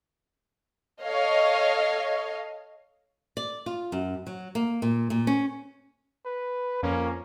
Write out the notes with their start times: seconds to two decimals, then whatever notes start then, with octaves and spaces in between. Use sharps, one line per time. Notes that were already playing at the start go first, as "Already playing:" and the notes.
1.04 A4 C#5 D#5 F5
3.37 D5
3.66 F4
3.92 F#2
4.27 F#3
4.55 A#3
4.82 A#2
5.10 A#2
5.27 C#4
6.26 B4
6.83 F2 A#3 C#4